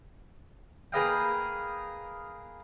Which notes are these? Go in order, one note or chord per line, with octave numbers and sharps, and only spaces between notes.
A#3 G#4 B4 D#5 F5 G5